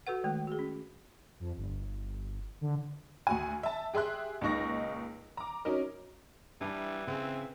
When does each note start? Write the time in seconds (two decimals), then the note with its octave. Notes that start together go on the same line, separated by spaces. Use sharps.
0.07 F#4 A4 B4 F#5
0.24 D#3 G#3 A3
0.47 F#4 G#4
0.59 C#4
1.40 F2
1.57 G1
2.61 D3
3.27 D2 F#4 G#5
3.63 E5 A5
3.94 G4 G#4 E5 C6 F#6
4.41 C#2 A#2 D#4 C#6 A#6
5.37 A#5 D6
5.65 F#3 C#4 D#4 A#4
6.61 E3 G3 D4 E4
7.07 C#3 C4